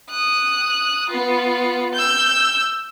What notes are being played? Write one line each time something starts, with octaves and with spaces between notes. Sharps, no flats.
D#6 F#6
B3 F4
E6 G6